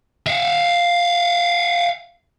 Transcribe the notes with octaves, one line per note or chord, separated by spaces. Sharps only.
E5 F5